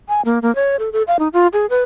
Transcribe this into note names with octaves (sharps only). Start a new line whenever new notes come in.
G#5
A#3
A#3
C#5
A4
A4
F5
D#4
F4
G#4
B4